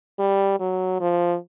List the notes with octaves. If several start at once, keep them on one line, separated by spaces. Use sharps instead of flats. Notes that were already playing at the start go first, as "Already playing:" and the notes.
G3
F#3
F3